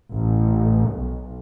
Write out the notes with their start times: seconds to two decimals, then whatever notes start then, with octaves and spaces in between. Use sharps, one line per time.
0.12 A1
0.91 B1